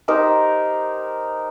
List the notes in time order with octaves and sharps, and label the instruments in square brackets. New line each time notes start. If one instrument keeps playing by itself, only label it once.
[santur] D#4 G4 A#4 C5